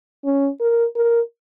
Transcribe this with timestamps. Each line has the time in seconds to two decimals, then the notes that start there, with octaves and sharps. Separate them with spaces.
0.25 C#4
0.61 A#4
0.96 A#4